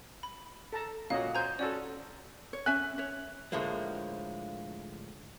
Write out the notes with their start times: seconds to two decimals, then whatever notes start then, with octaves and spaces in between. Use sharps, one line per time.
0.23 B5
0.73 A4 A5 A#5
1.10 A#2 C#4 F#4 D#5 F5
1.35 C5 G#5 A#5 G6
1.59 C#4 F#4 A4 D5
2.53 C#5
2.66 C#4 E5 G#5 F#6
2.98 C#5 E5
3.52 A2 D3 F3 G#3 A#3